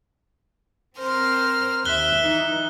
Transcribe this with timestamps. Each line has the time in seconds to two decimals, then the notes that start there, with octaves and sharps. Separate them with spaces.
0.98 C4 A#4 C5 F6
1.85 D#2 E5 F#6 G7
2.16 E3 D#4